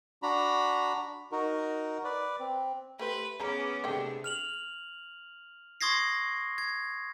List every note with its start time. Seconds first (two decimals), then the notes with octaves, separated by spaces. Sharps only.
0.23 D4 F#4 A#5 B5
1.32 D#4 F#4 A#4
2.04 B4 D5
2.40 C4
2.99 A3 G4 B4 C5
3.40 B3 C#4 G#4 D#5 A#5 B5 D6
3.84 C3 A3 D4 G#4 D#5 G5
4.24 F6 F7 F#7
5.81 C6 C#6 D#6 G#6 A#6 C7
6.58 G#6